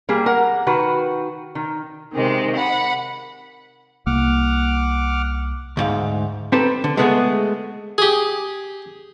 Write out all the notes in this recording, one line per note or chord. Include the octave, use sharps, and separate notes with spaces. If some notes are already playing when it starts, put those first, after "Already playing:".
G3 A#3 G#4
A#4 F#5
D#3 F#4 B4
D#3
C3 D#3 G#3 C4
F#5 B5
C2 A#3 F#5 D6 F6
D2 G#2 F5
C4 D#4 G4 A4 B4 A5
D3
G#3 A3 B3 C#4 F#4 G#4
G4 G#4